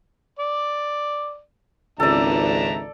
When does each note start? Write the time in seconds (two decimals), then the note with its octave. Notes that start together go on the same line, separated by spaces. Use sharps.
0.39 D5
2.00 G#1 C#2 D4 A4 D5 E5 A#5